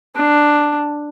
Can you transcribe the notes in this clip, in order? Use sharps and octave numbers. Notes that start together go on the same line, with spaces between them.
D4